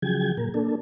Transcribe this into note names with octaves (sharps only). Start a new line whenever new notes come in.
C#3 F3 F#3 G#4 G5 G#6
A#2 A#4
A#3 D4 A4